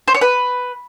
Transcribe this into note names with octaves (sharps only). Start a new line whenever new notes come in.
C5
C#5
B4